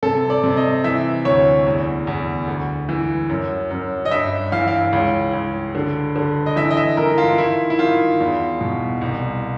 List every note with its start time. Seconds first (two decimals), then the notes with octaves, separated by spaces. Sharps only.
0.03 C3 A4
0.30 D5
0.43 C3
0.57 D#5
0.84 E3 E5
1.25 D2 C#5
1.66 E2
2.07 E2
2.48 D2
2.89 E3
3.29 F#2
3.70 F#2
4.05 D#5
4.11 G2 E5
4.52 E3 F5
4.68 F5
4.93 C#2
5.33 C#2
5.75 D3
6.16 D3
6.46 D#5
6.56 E3 E5
6.71 D#5
6.77 E5
6.97 E3 A#4
7.18 F4
7.38 D#3 E4
7.70 E4
7.79 D#3 F4
8.20 E2
8.61 B2
9.01 C2